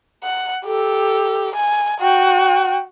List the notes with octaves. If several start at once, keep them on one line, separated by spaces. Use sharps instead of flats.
F#5
G4 A4
G#5
F#4 G5